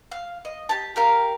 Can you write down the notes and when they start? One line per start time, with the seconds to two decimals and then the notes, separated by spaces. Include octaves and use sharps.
0.12 F5
0.45 D#5
0.69 G4 A5
0.96 G4 A#4 F5